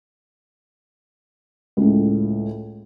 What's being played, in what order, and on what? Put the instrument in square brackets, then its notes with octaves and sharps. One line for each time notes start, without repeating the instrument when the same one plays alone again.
[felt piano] C#2 A2